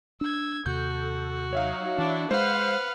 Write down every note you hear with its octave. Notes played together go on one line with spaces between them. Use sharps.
D4 E6 G#6
D#2 C3 F#4 A4 G6
F#3 D#4 C#5 E5 F5
E3 D4 E4
G#3 B4 C5 F5 F#5 F6